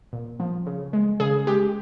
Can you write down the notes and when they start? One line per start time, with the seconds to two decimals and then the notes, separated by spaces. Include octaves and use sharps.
0.13 A#2
0.40 F3
0.66 C#3
0.93 G#3
1.20 C#3 G#4
1.47 G#3 G4